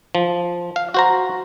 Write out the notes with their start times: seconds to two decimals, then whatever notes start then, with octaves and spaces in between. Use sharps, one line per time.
0.15 F3
0.76 F5
0.94 F#4 C5 A#5